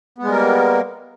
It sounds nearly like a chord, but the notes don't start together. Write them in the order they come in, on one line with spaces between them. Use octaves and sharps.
B3 G#3 G3 A#4 A#3